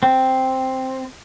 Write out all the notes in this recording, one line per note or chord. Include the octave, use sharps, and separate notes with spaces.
C4